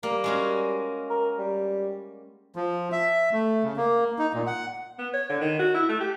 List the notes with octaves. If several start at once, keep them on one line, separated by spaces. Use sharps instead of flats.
G3 A#3
G#3 C#4 F#4
A#4
G3
F3
E5
A3
C#3
A#3
D#4
A#2
F#5
B3
C#5
D3
D#3
F#4
E4
A3
G4